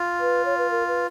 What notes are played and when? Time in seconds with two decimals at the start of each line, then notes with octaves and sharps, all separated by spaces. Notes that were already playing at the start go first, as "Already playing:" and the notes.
Already playing: F4
0.20 B4
0.45 C#5
0.58 B4
0.70 A#4
0.87 B4